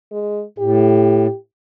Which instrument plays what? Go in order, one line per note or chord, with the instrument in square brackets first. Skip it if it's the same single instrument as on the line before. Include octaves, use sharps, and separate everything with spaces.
[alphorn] G#3
[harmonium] A2 [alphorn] G4